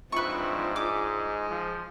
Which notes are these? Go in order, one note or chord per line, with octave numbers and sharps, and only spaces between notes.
G#2 F3 C4 D4 F4 B4 E5 C#6
G#3 D6
F3